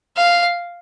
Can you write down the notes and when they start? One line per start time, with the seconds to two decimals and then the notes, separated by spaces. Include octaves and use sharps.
0.17 F5